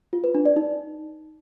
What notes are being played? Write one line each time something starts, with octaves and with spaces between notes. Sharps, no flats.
F4
B4
D4
D5
D#4